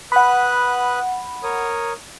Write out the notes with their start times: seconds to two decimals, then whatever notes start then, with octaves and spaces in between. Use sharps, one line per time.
0.12 B4 F#5 B5 D#6 F#6
1.43 A#4 C#5 D#6